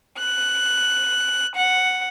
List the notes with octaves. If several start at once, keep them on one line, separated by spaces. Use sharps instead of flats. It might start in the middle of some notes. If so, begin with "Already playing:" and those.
F#6
F#5